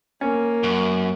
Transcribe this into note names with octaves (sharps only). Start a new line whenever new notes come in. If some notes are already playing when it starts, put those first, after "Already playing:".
A#3 C#4
F#2